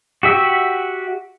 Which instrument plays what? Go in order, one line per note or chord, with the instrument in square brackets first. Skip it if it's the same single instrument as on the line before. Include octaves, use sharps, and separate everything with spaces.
[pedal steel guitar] F#4 G4 E5